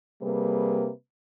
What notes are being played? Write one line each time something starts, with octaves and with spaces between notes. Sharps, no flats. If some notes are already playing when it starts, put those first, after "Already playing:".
C3 G3 A#3 G#4 B4